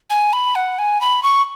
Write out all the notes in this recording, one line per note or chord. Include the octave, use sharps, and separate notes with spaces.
G#5
B5
F#5
G#5
B5
C#6